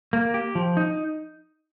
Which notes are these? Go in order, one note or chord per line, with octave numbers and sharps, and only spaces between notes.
A#3
G4
F3
D#4